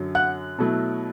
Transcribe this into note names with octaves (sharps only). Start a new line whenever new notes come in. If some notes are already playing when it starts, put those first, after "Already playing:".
Already playing: F#2 D3 F#3
F#5 F#6
B2 F#3 A3 E4